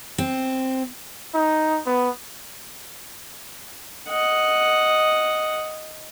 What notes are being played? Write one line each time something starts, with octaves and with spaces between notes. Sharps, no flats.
C4
D#4
B3
D#5 F#5